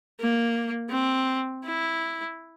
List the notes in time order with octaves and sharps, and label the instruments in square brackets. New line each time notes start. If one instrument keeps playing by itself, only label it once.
[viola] A#3
C4
E4